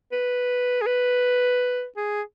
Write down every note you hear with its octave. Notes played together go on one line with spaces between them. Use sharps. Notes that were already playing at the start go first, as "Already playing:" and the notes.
B4
G#4
B4
G#4